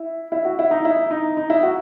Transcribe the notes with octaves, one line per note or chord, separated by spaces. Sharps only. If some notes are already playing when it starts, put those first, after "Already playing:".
Already playing: E4
E4
F#4
E4
D#4
E4
D#4
D#4
E4
F#4